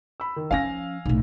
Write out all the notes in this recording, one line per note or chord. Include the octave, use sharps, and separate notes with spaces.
B5 E6
D#3
F3 C#4 F5 G#5 A#6
B1 A2